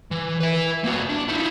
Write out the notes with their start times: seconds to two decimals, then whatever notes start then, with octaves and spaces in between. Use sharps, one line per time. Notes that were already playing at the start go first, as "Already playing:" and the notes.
0.11 E3
0.41 B4 E5
0.84 A#3 F#4
1.09 D4
1.28 D#4 E4